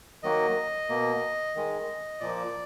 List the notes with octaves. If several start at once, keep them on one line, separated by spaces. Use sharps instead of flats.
D#3 F#3 A#3 D#5
B2 A#3
D#3 G#3
A#2 F3 A#3 D5